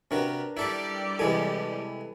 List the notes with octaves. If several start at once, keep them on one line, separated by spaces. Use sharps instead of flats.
C3 D4 F#4 G4 A#4 B4
G3 E4 G4 A4 D5 B5
C3 E3 G#3 A4 G#5